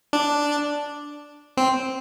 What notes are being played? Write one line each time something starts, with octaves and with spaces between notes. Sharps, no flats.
D4
C4